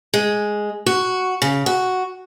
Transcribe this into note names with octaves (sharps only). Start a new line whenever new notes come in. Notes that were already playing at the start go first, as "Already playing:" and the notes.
G#3
F#4
C#3
F#4